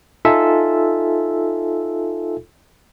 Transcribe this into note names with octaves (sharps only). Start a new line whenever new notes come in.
D#4 F4 A4 E5 G#5